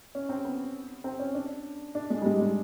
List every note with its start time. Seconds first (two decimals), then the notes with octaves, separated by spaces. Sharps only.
0.15 C#4
0.29 C4
0.45 B3
1.04 C4
1.19 C#4
1.34 D4
1.95 D4
2.10 G#3
2.22 G3
2.26 G#3
2.41 G#3